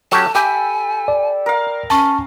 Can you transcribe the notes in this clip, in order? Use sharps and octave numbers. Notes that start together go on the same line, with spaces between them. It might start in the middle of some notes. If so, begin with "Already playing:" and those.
F#3 C#4 G4 A4 A5
G4 E5 G5 G#5 B5
D5
A#4 F5
C#4 A5 C#6